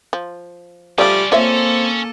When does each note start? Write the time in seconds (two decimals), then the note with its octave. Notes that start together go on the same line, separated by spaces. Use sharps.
0.13 F3
0.98 F3 G3 A3 C#4 D4 F4 D5
1.32 A#3 C4 C#4 F4 A4 C#5 E5